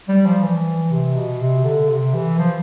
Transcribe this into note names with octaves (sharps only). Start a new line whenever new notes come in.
G3
F3
E3
C3
B2
C3
D3
C3
E3
F3